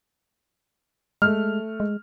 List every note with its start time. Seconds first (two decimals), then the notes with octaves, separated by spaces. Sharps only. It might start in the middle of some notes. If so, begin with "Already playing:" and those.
1.22 G#3 A3 F6
1.80 G#3